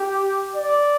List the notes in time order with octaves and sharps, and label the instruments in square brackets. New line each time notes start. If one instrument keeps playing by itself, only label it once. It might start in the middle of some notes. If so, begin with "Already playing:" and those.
Already playing: [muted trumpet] G4
D5